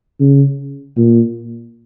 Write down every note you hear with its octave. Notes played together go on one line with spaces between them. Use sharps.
C#3
A#2